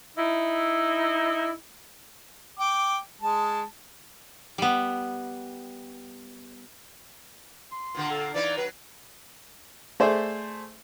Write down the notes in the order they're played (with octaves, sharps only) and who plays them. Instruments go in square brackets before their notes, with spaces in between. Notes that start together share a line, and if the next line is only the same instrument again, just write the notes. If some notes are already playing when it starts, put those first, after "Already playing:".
[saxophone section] D#4 E4
[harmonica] G5 D6
G#3 A5
[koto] G3 B3
[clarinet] C6
[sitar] A#2 D3 A#3
[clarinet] A4
[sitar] E3 A#3 D#4 [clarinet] D5
[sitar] F#3 [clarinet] B4
[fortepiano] A3 G#4 C5 D5 E5